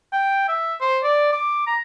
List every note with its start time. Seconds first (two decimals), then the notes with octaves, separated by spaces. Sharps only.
0.13 G5
0.48 E5
0.81 C5
1.03 D5
1.32 D6
1.67 A#5